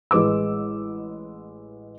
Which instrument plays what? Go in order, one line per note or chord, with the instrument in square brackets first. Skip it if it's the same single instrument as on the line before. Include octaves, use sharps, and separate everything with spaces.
[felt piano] A1 G#3 B4 D6 E6